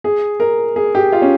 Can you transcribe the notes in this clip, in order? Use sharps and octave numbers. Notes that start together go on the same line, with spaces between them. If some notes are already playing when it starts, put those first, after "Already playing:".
G#4
A#4
G#4
G4
F4
C#4